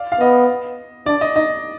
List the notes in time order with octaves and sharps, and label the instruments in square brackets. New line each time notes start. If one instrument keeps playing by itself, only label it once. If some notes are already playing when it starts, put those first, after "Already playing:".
Already playing: [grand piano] D5 F5
F5
[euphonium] B3 [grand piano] D#5
[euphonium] D4 [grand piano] D5
[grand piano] D#5
[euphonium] D#4 [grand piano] D#5